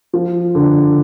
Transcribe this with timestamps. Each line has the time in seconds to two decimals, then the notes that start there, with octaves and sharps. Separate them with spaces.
0.13 F3
0.55 D3